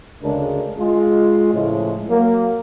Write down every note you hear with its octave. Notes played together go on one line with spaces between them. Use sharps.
D2 C#3 G#3 D4 A#4
G#3 F4
A2 C#3 F3 G#3
F#3 A#3